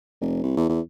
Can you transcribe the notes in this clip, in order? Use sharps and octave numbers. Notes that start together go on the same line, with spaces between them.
F1
C2
E2
E2